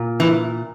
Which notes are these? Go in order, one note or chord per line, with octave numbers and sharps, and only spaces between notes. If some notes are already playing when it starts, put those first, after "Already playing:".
Already playing: A#2
E3